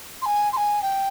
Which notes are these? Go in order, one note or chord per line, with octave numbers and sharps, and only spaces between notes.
C6
G#5
C6
G#5
G5